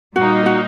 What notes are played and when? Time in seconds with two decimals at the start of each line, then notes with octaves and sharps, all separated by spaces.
0.16 A#2 G3 A#3 D#4 F#4
0.46 F#4